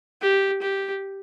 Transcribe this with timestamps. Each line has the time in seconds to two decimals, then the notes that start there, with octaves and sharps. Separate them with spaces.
0.22 G4
0.62 G4